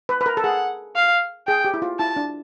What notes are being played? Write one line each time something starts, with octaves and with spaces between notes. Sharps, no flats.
B4
B4
A#4
A4
G#4 F#5
F5
G#4 G5
G4
E4
F4
E4 A5
D4